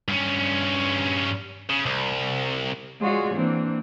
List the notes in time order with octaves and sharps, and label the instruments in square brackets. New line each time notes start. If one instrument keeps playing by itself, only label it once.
[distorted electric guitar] G2 C#4
C#3
C2
[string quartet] G#3 F4 F#4 G#4 C#5 D5
E3 A#3 C4 D4